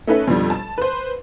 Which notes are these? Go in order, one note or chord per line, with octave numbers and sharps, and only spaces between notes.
A3 C#4 D#4 A4 B4 E5
F2 B2 D3 F3 G3
A5
B4 C5